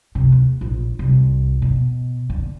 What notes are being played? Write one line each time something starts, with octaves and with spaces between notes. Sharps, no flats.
C3
D#2
A#1
C2
B2
D3